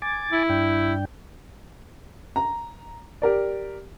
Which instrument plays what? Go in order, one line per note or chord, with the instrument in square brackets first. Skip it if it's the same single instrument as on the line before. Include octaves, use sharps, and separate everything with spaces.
[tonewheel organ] G#5 D6 A6
[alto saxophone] E4
[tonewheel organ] G2 D4 G5
[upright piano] A#5
G4 A#4 D5